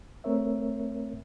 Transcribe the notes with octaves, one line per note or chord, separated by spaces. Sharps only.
A3 C4 A#4 C#5 E5